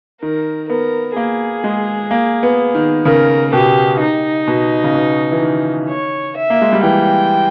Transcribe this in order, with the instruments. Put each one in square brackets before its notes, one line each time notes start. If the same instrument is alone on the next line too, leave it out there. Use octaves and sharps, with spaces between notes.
[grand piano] D#3 [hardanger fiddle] A#4
[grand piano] B3 [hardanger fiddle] A#4
[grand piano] A#3 [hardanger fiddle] G#4
[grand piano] G#3
A#3
B3
D#3
[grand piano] C#3 [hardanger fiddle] A#4
[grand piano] B2 [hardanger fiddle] G4
[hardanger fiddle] D#4
[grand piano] B2
C#3
B2
E3
D#3
[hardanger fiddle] C#5
E5
[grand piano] A#3
G#3
G3
[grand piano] E3 [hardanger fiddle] G5